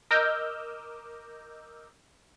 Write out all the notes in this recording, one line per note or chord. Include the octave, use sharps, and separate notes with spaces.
A#4 D#5 D6 E6 F6 G6